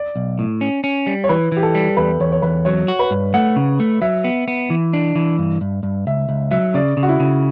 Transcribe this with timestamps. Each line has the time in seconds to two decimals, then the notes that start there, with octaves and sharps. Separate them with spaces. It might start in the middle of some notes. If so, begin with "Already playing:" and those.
Already playing: D5
0.16 B1
0.39 A2
0.61 C#4
0.84 C#4
1.07 G3
1.24 C#5
1.29 E3 B4
1.52 E3 G4
1.63 A4
1.75 G3
1.97 E2 B4
2.20 E2 C#5
2.32 C#5
2.42 E2 B4
2.65 F#3 C#5
2.88 F#4
2.99 B4
3.11 G2
3.34 A3 F#5
3.56 C#3
3.80 A3
4.02 F#3 E5
4.24 B3
4.48 B3
4.70 E3
4.93 D4
5.16 E3
5.39 G2
5.61 G2
5.83 G2
6.07 C#2 E5
6.29 C#2
6.51 F#3 E5
6.74 C#3 D5
6.97 C#3
7.03 F#4
7.09 E4
7.20 C#3